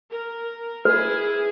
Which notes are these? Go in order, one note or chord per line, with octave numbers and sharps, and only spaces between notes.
A#4
E4 G#4 B4